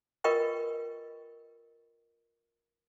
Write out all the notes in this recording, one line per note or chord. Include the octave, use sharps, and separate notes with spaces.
F4 A#4 B4 D#5 G5 C#6